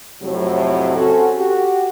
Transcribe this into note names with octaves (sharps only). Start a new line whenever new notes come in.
F2 A2 C3 F#3
C4 C#4 F#4 A4
F#4 G4